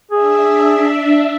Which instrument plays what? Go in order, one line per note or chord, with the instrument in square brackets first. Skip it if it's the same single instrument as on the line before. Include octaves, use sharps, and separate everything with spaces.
[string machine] D4 E5 [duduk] G#4